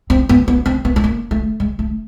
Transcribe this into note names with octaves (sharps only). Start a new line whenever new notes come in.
C4
B3
B3
C4
B3
A3
A#3
A3
G#3
A3